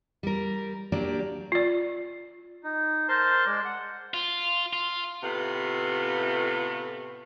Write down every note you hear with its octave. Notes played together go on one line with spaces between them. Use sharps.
G3 A#4
F#3 A#3 D4 G4 D5
F4 D5
D#4
A#4 C5 A5 C6
G#3 D5
F#5
F4
F4
A2 C3 A3 B3 F4